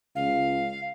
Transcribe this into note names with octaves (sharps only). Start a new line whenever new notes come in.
C#2 F5